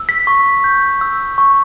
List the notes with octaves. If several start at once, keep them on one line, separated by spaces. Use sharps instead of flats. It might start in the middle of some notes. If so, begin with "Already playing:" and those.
Already playing: E6
B6
C#6
G6
E6
C#6